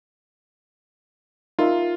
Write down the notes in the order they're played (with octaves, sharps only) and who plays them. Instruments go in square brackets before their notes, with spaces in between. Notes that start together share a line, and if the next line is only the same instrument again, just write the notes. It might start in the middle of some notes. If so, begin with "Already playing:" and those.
[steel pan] D#4 A#4 E5 [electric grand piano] F4